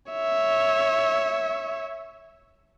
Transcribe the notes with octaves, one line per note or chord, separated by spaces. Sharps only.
C#5 E5